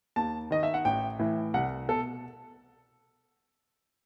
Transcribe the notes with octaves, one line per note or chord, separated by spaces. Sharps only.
D#2 A5
D#3 D#5
E5
F#5
A1 G5
A2 E3
C2 F#5
B2 A4